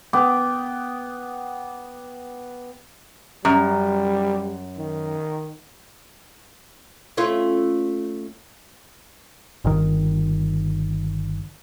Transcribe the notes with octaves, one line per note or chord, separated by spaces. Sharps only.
B3 G5 D6
F#2 G3
D#3
A3 C#4 F4
G1 D#3